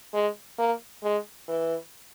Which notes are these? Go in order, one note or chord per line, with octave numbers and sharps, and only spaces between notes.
G#3
A#3
G#3
E3